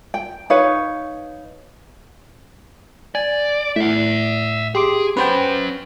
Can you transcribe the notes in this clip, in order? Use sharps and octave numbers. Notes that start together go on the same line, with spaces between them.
G5
D#4 B4 C#5 F5
D5 G#5
A2 E5 F#5
G4 G#4 C6 D6
C#4 B4 C5 F#5 G5